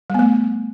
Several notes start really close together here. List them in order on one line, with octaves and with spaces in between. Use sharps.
G3 B3 A3